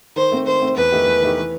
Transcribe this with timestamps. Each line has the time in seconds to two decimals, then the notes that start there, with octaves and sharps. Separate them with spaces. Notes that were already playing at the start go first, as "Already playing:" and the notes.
0.16 D#3 C5
0.31 A3 C4
0.47 D#3 C5
0.61 A3 C4
0.76 E2 B4
0.92 D#3 A3 D#4 G4
1.06 E2
1.22 D#3 A3 D#4 G4
1.37 E3